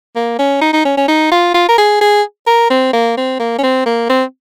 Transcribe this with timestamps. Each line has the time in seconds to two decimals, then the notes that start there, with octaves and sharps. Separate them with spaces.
0.15 A#3
0.39 C#4
0.61 D#4
0.73 D#4
0.85 C#4
0.97 C#4
1.08 D#4
1.31 F4
1.54 F4
1.69 A#4
1.78 G#4
2.01 G#4
2.47 A#4
2.70 C4
2.93 A#3
3.17 C4
3.39 A#3
3.58 C#4
3.63 C4
3.86 A#3
4.09 C4